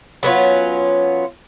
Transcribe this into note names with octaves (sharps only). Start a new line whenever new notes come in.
F#3 B3 C#4 F4